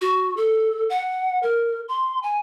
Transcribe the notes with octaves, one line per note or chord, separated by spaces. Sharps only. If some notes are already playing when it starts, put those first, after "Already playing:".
F#4
A4
F#5
A#4
C6
G#5